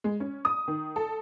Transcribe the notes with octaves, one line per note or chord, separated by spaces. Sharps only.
G#3
C#4
D#6
D#3
A4